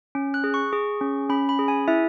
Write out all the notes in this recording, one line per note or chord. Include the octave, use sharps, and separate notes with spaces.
C#4
F#6
G#4
C#6
G#4
C#4
C#4 B5
B5
G#4
G#5
E4 E5